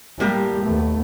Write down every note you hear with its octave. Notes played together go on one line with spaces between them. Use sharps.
A2 G3 A#3 G4
D#2 A3 B3